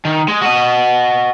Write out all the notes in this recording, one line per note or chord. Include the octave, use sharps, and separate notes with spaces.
D#3
G#3
F#4 D#5